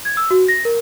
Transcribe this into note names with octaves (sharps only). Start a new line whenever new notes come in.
G#6
E6
F#4
A#6
A#4